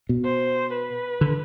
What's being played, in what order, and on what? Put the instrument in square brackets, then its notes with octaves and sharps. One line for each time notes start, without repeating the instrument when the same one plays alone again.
[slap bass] B2
[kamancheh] C5
B4
[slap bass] D3